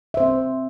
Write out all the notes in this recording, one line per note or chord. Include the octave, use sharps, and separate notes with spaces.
C4 C5 E5